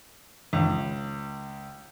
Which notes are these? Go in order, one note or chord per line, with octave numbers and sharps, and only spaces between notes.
C#2